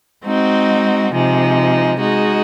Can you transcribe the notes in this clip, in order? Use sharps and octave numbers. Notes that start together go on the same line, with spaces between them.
G#3 C4 D#4 F#4
C3 F3 G#3 D#4
G#3 D#4 F#4